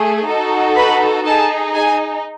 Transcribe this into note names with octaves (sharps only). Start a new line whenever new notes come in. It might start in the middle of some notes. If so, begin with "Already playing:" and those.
Already playing: A3 G#4
D#4 F#4 A4
B4 B5
D#4 G#4 A4 A5
G#4 G#5